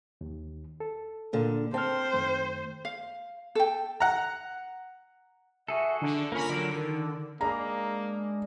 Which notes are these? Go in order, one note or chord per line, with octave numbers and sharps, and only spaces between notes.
D#2 D#3
A4
A#2 D3
C4 C5 A5 F6
F#2 D#3 A3
F5
A4 G5
F#5 A#5
F#4 G#4 A4 E5
D3 D4
A#3 C#4 F4 A#4 B5
D3 F#3 A#4
D#3 A#4
G#3 A#3 D4 G#4 A#5 B5